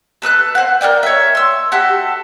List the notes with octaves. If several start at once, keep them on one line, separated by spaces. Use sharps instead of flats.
A4 B4 D#6 F#6
C5 F#5
A#4 C5 D5 G5
C#5 E5
C6 E6
F#4 G4 A4 E5